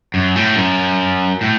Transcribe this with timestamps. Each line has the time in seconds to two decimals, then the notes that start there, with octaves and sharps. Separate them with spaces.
0.14 F#2
0.36 A2
0.56 F#2
1.41 A2